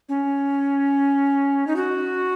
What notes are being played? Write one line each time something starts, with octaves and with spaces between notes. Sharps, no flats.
C#4
D#4
F#4